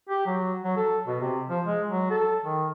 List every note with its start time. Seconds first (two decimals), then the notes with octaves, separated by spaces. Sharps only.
0.09 G4
0.26 F#3
0.64 F#3
0.77 A4
1.07 B2
1.21 C3
1.49 F3
1.67 G#3
1.89 F#3
2.10 A4
2.44 D#3